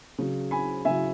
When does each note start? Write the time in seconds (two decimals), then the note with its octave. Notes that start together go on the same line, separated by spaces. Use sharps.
0.18 C#3 F#3
0.51 G#5 B5
0.85 C#3 F#3 E5 G#5